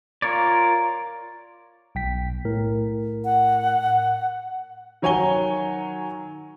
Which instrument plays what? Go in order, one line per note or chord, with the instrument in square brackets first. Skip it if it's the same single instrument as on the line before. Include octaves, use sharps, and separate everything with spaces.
[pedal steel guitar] F4 A#4 C#5 D5
[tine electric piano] B1 G5 B6
A2 A#4
[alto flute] F#5
[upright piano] D#3 F#3 C#5 G#5 A#5 G7